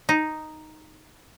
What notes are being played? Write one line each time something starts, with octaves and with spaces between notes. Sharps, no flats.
D#4